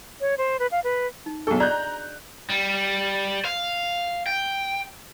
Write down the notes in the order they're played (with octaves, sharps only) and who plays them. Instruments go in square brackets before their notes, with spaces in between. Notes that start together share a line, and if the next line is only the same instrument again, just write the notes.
[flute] C#5
C5
B4
F5
B4
[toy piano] D#4
[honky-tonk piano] B1 A4 [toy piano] D4 G#4
[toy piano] D5 D#5 [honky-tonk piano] A#5 F#6 G6
[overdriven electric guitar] G3
F5
G5